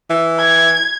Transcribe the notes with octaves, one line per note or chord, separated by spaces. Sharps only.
E3
G#6